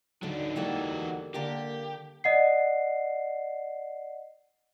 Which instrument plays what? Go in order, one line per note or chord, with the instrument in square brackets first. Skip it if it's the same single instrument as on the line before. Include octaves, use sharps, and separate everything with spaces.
[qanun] D3 [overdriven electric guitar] F#3 D4 [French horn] D#4
[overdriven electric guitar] E3 F#4 [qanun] G3 A#3 A4
[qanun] D3 A#4 [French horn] A#3 [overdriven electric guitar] G4
[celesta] D5 D#5 F#5 C7